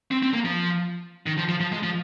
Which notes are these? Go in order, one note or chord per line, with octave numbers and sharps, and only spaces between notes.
C4
C4
A#3
F3
D#3
F3
F3
F3
G#3
F3